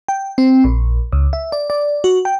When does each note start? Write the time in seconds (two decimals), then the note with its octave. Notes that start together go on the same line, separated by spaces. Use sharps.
0.08 G5
0.38 C4
0.64 A#1
1.13 C#2
1.33 E5
1.52 D5
1.70 D5
2.04 F#4
2.25 G5